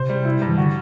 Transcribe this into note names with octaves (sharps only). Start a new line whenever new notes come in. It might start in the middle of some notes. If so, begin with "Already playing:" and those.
Already playing: C3 C5
G3
E4
G2
E3
D3 F#4